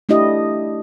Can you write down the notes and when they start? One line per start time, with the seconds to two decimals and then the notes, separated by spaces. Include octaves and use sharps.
0.09 A3 D4 E4 G4 D#5